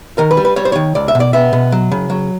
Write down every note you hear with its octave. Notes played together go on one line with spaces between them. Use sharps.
D#3 A#4
B4
G3
B4
G3 C#5
C5
D#3 C#5
C#2 D5
E5
B2
D5
B3 E5
B2
F#3
C#3
F#3